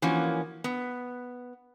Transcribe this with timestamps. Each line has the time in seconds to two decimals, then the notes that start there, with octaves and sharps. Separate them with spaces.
0.02 E3 F3 A#3 C#4 F#4
0.64 B3